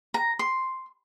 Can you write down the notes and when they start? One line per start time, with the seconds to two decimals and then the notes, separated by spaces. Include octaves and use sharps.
0.14 A#5
0.39 C6